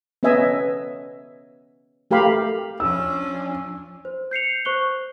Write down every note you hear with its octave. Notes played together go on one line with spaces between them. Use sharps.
B3 C#4 B4 D#5 E5 G#5
A3 G4 A#4 F5 B5
F3 C#4 D4 E6
C5
G6 C7 C#7 F7
C5 C#6 F#6 G7